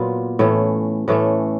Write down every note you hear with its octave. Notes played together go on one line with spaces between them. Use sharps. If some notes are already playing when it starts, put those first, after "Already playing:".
Already playing: A#2 F#3 B3 F4
A2 E3 A3 C#4
A2 E3 A3 C#4